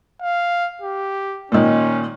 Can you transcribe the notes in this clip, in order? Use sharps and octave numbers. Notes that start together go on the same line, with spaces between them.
F5
G4
A#2 D#3 C#4